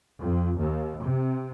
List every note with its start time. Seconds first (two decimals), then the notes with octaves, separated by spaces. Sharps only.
0.20 F2
0.59 D#2
1.02 C3